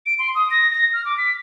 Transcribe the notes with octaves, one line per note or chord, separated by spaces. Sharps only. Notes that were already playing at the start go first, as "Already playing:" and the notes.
D7
C6
D#6
A#6
A#6
F6
D6
B6